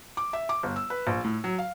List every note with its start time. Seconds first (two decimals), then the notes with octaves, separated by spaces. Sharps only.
0.17 D6
0.33 E5
0.49 D6
0.63 G1
0.76 E6
0.90 B4
1.07 A#1
1.24 A2
1.44 F#3
1.59 F5